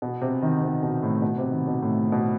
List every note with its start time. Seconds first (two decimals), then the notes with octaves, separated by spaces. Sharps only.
0.02 B2
0.21 C3
0.42 D#3
0.62 C3
0.83 B2
1.02 A2
1.22 B2
1.38 C3
1.52 D#3
1.67 B2
1.82 A2
2.12 B2